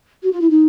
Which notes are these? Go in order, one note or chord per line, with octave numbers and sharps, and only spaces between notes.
F#4
F4
E4
D#4